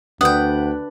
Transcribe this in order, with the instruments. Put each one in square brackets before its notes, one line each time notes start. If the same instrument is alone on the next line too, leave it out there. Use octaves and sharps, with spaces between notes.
[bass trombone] D2 [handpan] D4 B4 [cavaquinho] F#5 G5 [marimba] D#6